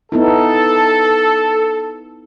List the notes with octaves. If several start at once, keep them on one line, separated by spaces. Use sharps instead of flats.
B3 D#4 E4 A4